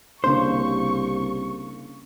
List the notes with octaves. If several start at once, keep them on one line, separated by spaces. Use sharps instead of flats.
C2 C#3 A#3 D4 C5 C#6